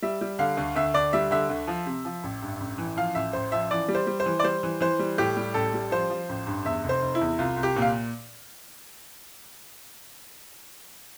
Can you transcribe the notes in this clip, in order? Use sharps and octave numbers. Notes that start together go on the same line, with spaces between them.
G3 E5
G3
D3 F5
D2
D2 E5
D2 D5
G3 E5
D3 E5
D2
F3
C3
F3
A1
G2
A1
E3
F3 F5
A1 E5
A1 C5
F3 E5
E3 D5
G3
C5
G3
C5
E3
D5
G3 C5
E3
E3 C5
G3
A2 G4
G3
A1 A4
G3
F3 C5
F3
A1
G2
E2 E5
F1
C5
F1
E4
E2
C2 F4
C2
G4
A#2
F5